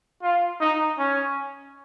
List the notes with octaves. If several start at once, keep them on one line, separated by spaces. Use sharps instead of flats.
F4
D#4
C#4